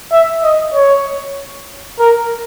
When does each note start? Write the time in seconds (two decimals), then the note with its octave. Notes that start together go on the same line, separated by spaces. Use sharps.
0.12 E5
0.43 D#5
0.74 C#5
1.99 A#4